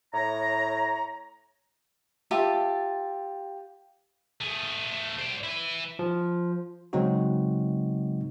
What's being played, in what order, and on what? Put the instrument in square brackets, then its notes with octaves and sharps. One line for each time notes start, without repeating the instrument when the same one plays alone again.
[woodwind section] A2 C#5 A#5
[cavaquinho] F4 G4 E5 A5
[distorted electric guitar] A3 G#4
C5 D5
E4 B4
[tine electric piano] F3
C#3 F#3 G#3 C4 D#4 F#4